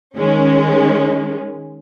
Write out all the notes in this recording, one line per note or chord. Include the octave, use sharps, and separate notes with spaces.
D#3 G#3 C#4